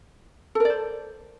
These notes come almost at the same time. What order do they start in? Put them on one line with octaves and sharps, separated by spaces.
A4 A#4 D5 C5